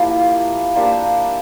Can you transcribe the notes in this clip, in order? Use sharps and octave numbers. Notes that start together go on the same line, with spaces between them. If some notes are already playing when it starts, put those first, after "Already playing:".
Already playing: F3 A#3 E4 G4
A#3 D4 G4 C5